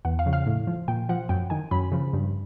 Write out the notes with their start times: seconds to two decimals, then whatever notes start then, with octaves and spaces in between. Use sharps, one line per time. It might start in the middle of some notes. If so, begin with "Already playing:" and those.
0.05 E2 F#5
0.19 F5
0.26 C#3 F3
0.33 F5
0.47 A2
0.67 F3
0.88 A#2 G5
1.09 F3 F#5
1.29 F#2 G5
1.50 D#3 G#5
1.71 F#2 B5
1.92 C#3 F3
2.13 G2